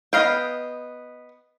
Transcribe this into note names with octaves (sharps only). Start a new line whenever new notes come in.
B3 D#5 F5 G5